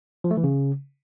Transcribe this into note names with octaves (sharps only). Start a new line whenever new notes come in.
F3
A3
E3
C#3